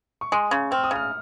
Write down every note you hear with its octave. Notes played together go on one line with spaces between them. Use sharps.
C#6
G#3 C6
C#3 C#6
C4 F6
D#6
C#3 F6